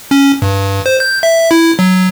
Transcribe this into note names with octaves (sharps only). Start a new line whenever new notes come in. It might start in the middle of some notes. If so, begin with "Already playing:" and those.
C#4
G2
C5
G6
E5
E4
F#3